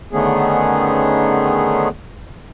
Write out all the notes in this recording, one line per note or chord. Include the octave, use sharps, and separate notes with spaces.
D3 D#3 A3 B3 C#4 G#4